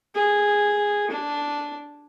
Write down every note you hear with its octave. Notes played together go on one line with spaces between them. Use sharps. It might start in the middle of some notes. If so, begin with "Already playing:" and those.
G#4
D4